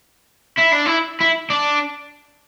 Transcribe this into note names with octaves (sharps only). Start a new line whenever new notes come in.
E4
D4
E4
E4
D4